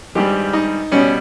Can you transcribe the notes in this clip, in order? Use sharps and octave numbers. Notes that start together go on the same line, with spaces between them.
G#1 G2 G3 G4
D#4
B2 G3 C#4